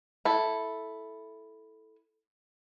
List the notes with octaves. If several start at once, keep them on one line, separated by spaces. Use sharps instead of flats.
E4 A4